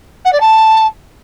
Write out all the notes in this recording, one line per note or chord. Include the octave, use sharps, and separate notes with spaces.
F#5
D5
A5